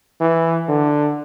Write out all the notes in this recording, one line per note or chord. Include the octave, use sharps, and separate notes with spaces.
E3
D3